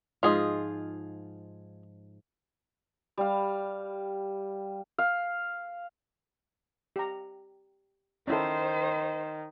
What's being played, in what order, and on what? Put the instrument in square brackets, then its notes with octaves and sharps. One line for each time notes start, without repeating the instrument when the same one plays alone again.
[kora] G#2 F3 [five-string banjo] F4 G#4 D#5
[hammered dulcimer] G3 F5
[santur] F5
[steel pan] G4 A#5
[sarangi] D#3 [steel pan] C#4 E4 A4 [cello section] C5